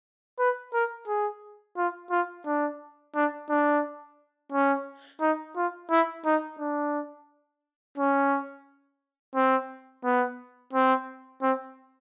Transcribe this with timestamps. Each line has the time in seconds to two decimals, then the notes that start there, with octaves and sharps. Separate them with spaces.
0.39 B4
0.74 A#4
1.07 G#4
1.77 F4
2.11 F4
2.46 D4
3.15 D4
3.50 D4
4.52 C#4
5.21 D#4
5.56 F4
5.90 E4
6.25 D#4
6.59 D4
7.98 C#4
9.36 C4
10.04 B3
10.73 C4
11.42 C4